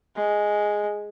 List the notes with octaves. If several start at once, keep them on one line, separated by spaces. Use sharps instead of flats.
G#3